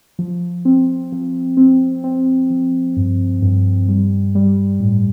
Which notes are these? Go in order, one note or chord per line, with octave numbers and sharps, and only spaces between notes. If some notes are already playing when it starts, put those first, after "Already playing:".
F3
C4
F3
C4
C4
F3
G2
G2
G3
G3
A2